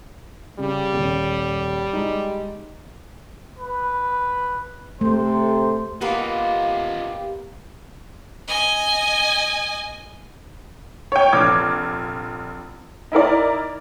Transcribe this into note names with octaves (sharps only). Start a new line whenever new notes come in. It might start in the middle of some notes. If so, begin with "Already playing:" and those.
C#3 G3
D#1
G#3 D#4
B4
C3 A3 A4 C5
A#3 B3 D#4 F4 G4 B4 F5
D#5 G#5
C#5 G5
F1 A#1 D6 G#6
D#4 E4 A#4 D5